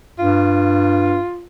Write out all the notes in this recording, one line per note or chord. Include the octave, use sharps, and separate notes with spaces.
G2 F4